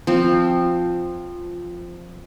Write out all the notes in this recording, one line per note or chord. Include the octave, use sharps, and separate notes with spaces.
F3 C4